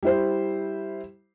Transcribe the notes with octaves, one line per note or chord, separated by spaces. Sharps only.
G3 E4 C5